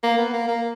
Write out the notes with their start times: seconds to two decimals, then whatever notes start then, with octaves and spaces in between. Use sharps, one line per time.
0.03 A#3
0.18 B3
0.33 A#3
0.48 A#3